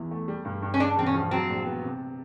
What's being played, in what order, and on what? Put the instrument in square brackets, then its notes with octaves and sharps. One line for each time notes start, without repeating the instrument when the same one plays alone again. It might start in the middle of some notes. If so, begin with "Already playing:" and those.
Already playing: [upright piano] E2 E3
A3
G3
G2
G2
[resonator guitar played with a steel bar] C#4
[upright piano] C#3 [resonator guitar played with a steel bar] D4
[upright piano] E1 [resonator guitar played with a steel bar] C4
[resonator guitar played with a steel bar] C#4
[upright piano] F3
[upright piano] F#3 [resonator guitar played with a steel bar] C4
[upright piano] A#1
B3
C3